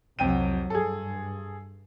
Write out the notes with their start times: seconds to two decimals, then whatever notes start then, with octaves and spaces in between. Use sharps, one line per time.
0.19 C2 F2 F#3 G5 D#7
0.70 G2 G#4 A4